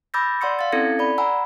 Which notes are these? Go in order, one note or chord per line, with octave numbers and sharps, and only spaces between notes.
B5 D6 E6 G6 A6 A#6
D5 F#5 C6 E6 C#7
F5 A6
C4 C#4 E4 A4 G#6 C#7
D5 B5
F#5 G#5 A#5 B5 E6